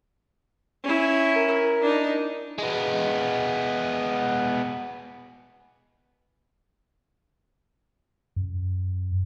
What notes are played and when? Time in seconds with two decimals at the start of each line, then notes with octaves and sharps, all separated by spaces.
0.84 C#4 E4
1.36 A#4
1.82 D4 D#4
2.58 G#3 B3
8.36 F#2